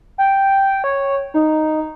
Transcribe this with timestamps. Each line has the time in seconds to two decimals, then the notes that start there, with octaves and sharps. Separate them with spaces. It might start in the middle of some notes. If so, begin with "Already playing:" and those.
0.18 G5
0.84 C#5
1.34 D#4